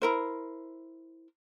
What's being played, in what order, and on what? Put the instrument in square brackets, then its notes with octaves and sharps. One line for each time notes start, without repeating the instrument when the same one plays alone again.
[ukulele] E4 A#4 C5